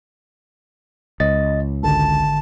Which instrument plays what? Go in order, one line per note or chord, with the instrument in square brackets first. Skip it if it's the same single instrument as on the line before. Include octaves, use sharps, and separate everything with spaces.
[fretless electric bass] C#2 [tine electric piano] D#5 A6
[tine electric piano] G#1 D3 [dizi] A5